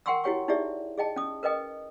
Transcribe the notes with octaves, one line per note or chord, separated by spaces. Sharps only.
A#4 F#5 G5 C6 C#6 E6
E4 F#4 G4 C#5 G5 C#6
D#4 E4 G4 G#4 D5 E5
G#4 D#5 G5 A5
C#4 D#6
A#4 B4 D#5 G5 D#6